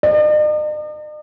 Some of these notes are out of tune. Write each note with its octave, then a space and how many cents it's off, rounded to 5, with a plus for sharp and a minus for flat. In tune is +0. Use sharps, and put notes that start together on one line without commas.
D#5 -45